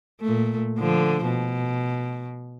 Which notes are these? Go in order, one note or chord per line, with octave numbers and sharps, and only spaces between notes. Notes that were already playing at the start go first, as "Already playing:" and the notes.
A#2 A3
D3 F3
B2